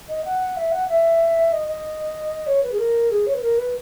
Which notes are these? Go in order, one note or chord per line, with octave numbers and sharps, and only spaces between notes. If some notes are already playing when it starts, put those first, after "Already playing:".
D#5
F#5
E5
F#5
E5
D#5
D#5
C#5
B4
G#4
A#4
G#4
C#5
B4
A#4
B4